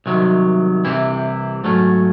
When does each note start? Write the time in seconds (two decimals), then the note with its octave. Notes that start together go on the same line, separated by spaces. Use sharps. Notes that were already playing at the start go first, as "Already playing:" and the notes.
0.06 C2 C3 D#3 F#3
0.85 C2 C3 E3 C4 E4
1.64 G#2 F#3 A3 C#4